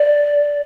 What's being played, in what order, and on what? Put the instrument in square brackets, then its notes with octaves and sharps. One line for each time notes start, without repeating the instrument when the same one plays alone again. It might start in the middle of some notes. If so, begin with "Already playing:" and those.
Already playing: [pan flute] D5